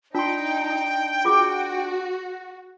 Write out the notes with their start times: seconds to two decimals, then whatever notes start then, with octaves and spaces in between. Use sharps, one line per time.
0.15 D4 D#4 F4 G5 C6
1.25 F4 F#4 G#4 D6